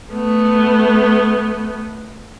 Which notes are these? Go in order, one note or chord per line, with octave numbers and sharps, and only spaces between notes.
A3 B3